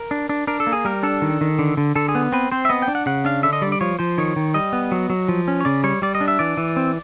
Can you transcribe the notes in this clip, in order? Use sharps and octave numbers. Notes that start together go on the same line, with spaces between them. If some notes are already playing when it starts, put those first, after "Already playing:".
Already playing: A#4
D4
D4
D4 A#4
A4
A#3
G#4
G3 A#4
D4 A4
D#3
D#3
D3
D3
D3 A4
G#4
B3
C4 B4
C4 C5
E5
B3 D#5
G5
D4
F#5
C#3 F#5
D4 F5
D3 E5
D#5
G3 D5
D5
F3 C#5
F3 C5
D#3 C#5
D#3
G3 D#5
B3
F#3
F#3
F3
C#4
C#5
C#3 D5
G3 C#5
G3 D5
D#5
D4
E5
E3 D5
E3
C4